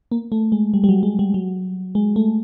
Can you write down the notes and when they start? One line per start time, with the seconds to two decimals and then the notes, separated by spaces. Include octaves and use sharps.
0.11 A#3
0.32 A3
0.52 G#3
0.74 G3
0.84 G3
0.89 F#3
1.03 G#3
1.19 G3
1.34 F#3
1.95 G#3
2.16 A3